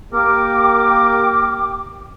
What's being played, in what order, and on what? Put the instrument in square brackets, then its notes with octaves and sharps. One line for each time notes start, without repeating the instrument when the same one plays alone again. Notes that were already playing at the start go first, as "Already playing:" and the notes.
[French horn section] A#3 [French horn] G4 [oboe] A#4 [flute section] G5 D6